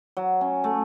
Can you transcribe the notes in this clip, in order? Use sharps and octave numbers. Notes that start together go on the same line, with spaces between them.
F#3
C#4
A3